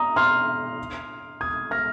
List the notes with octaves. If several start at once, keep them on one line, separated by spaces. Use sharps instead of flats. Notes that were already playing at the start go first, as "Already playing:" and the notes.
Already playing: A#5 D#6
C6 F6
D#6 G#6
F6 A#6